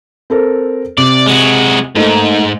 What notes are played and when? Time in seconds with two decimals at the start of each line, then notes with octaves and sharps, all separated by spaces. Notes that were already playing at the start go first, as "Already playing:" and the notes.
0.30 C4 A4 A#4
0.98 C3 D5
1.26 G#3 F#4
1.96 G#2 A3 A#3 D#4